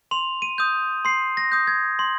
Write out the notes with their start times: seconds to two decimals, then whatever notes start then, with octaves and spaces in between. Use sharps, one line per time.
0.11 C6 F7
0.42 D#7
0.58 D#6 G6
1.05 C6 C7
1.37 A#6
1.52 D#6 G6
1.67 G#6
1.99 C6